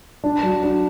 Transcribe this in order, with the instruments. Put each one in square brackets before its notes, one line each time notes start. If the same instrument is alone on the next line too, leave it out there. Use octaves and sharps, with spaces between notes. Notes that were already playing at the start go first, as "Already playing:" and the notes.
[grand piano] D4
F#3
D4